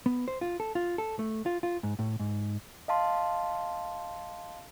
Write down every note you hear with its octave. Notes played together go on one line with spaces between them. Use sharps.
B3
C5
F4
A4
F4
A4
A3
F4
F4
G#2
A2
G#2
D#5 F5 A5 C6